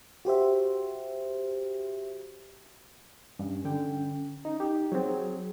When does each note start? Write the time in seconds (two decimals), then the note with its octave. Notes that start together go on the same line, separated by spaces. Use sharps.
0.25 F#4 G4 C5 E5
3.39 G2 C#4
3.65 D3 G5
4.45 C#4 D#4
4.60 D#4 G4
4.92 F#3 C4 G#4